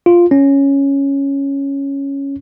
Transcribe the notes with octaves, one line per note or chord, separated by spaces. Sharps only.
F4
C#4